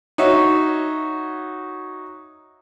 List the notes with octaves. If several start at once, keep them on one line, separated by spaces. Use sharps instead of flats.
D#4 F#4 C#5 E5